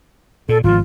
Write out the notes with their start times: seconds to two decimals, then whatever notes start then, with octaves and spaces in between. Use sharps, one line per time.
0.49 A#2 A4
0.64 G#1 D3 F3 F4